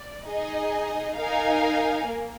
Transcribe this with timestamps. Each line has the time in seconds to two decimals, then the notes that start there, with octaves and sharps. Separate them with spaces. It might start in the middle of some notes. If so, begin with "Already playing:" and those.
Already playing: D5
0.26 D#4 G#4 D#5 G#5
1.17 D#4 A#4 F5 G#5
2.08 A#3